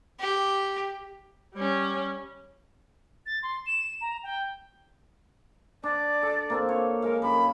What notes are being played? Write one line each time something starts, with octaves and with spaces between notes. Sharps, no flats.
G4
G3 C#4
A6
C6
E7
A#5
G5
D4 D5
A4
A#3 C4 A4
C#5
G#3 A#4 F5
F#2 B5